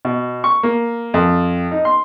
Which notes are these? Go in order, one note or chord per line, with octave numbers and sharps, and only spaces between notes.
B2
C#6
A#3
F2
D#4
C6